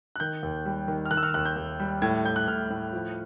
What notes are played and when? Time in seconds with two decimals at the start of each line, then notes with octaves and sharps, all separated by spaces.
0.16 F#6
0.20 D#3 G6
0.43 D#2
0.66 G3
0.88 D#3
1.05 F6
1.11 D#3 F#6
1.17 E6
1.23 F6
1.34 D#2 F#6
1.45 G6
1.57 D#2
1.80 G3
2.02 A2 G#6
2.25 A2 G6
2.36 F#6
2.48 A2 F6
2.70 A2
2.93 F3